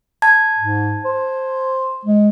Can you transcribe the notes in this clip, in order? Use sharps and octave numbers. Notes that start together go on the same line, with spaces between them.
A5 G#6
G#2
C5
G#3